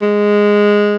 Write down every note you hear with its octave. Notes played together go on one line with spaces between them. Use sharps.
G#3